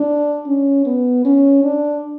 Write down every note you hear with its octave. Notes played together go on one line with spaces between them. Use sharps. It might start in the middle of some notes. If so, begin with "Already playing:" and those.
Already playing: D4
C#4
B3
C#4
D4